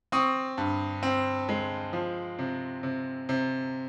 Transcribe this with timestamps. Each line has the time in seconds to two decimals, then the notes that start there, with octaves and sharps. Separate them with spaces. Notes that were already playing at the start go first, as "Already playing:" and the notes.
0.12 C4 C#6 D#6
0.58 G2
1.03 C4
1.49 G#3
1.93 F3
2.39 C3
2.83 C3
3.29 C3